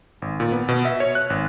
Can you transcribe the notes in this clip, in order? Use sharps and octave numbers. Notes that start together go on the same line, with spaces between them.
G#1
A#2
B3
B2
E5
C#5
F#6
G#1